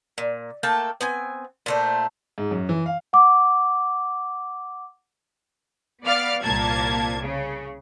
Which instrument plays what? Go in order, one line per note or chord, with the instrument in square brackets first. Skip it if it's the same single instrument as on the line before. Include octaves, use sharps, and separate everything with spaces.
[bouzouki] A#2
A3 A#3 G5 A5
B3 C4 G#5
A#2 A3 C5
[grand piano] G#2
F#2
E3
F5
[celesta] F#5 D6
[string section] B3 D5 F5 F6
C2 A#2 A#3 A5 G#6
C#3